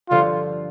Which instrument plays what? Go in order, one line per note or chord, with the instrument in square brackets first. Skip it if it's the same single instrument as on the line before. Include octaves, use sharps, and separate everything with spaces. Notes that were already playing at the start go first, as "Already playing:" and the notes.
[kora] G2 D3 F3 [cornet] F4